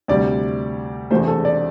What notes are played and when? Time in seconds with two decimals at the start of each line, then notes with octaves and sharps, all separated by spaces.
0.08 D2 C3 G3 D5
1.11 E1 E2 C3 E3 A3 C5
1.28 A4
1.45 D5